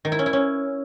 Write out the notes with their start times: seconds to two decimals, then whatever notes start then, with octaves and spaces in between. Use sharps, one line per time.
0.05 D#3
0.12 E4
0.19 C#4
0.26 E4
0.33 C#4